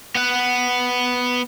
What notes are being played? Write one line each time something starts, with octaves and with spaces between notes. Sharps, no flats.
B3 F#5